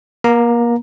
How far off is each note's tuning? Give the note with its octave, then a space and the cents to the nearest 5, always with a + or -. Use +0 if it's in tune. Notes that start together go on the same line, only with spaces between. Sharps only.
A#3 +30 A#5 +0